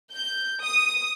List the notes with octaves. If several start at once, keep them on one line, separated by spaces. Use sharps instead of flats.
G6
D#6